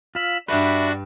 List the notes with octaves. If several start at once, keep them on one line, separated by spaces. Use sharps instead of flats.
F4 F5 B5 E6
G2 D4 F#4 B4 E5 B5